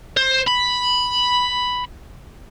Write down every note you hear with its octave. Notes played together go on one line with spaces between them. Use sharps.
C5
B5